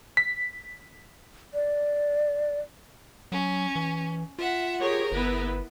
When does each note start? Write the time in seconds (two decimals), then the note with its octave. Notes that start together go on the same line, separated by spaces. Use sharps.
0.17 B6
1.54 D5
3.32 F#3 C#4
3.76 E3
4.39 F4 E5 F#5
4.80 G4 G#4 A#4 C#5
5.12 G1 B3 E4 B4